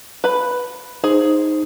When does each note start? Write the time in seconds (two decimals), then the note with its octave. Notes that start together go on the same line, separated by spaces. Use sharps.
0.24 B4 B5
1.04 D#4 G#4 C5